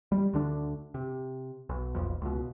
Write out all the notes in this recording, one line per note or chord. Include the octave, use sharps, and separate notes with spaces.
G3
D2 D3 D4
C3
B1
D#1 B1 F2
C#2 B2